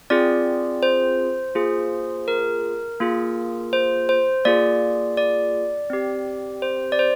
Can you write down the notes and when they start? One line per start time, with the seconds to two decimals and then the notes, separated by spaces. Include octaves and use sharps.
0.10 C4 F4 G#4 D5
0.83 C5
1.55 A#3 F4 G#4
2.28 A#4
3.00 A#3 F4 G#4
3.73 C5
4.09 C5
4.45 A#3 F4 G#4 D5
5.17 D5
5.90 C4 G4
6.62 C5
6.92 D5
6.99 C5